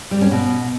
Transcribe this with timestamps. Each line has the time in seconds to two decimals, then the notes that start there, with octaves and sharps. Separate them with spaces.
0.11 G3
0.21 C#4
0.31 B2